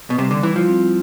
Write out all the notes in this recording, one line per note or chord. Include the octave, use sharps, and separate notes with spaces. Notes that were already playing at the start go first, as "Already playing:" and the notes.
B2
C3 G3
D3
E3 E4
F3
C4